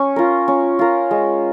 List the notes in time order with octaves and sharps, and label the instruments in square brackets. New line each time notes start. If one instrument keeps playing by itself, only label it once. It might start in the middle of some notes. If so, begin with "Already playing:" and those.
Already playing: [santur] C#4
F4 A#4
C#4
F4 A#4
G#3